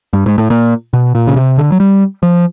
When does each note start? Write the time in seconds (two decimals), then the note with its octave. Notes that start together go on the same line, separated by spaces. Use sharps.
0.13 G2
0.26 G#2
0.38 A2
0.50 A#2
0.93 B2
1.15 A#2
1.27 C#3
1.36 C3
1.58 D3
1.72 F#3
1.80 G3
2.23 F3